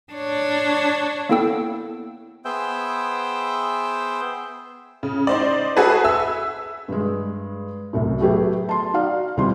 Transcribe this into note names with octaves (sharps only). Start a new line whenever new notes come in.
D4 C#5
A#3 B3 E4 A4 G5 E6
B3 G#4 C5 E5 G5
C#3
D#4 C5 D5
F#4 G#4 A4 B4
E5 E6
G2 G#3
C2 F#2 A2
F#3 A3 B3 G4 G#4 E5
A5 C6
D#4 F#4 D5 F5
C#2 G3 C4 E4 C6